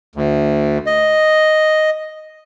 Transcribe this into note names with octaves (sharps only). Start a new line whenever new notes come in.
D2
D#5